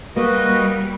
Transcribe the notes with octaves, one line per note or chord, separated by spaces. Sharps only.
G3 A#3 F#4 B4 D#5